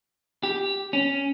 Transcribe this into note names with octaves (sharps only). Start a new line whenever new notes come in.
G4
C#4